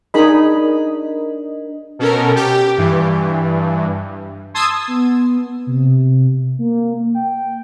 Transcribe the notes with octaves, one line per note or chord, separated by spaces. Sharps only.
D4 D#4 G#4 A#4 D#5 B5
B2 C#4 A4 A#4
G4
G2 E3
A5 C6 D#6 E6 G#6
B3
C3
A#3
G5